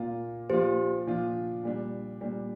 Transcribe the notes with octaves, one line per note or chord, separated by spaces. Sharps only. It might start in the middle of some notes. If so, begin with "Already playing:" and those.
Already playing: A#2 A#3 F4
A#2 F3 D4 F4 G4 C5
A#2 F3 D4 F4
A#2 G3 D4
A#2 G3 D4